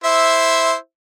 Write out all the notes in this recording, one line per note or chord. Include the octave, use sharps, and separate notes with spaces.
E4 C5 E5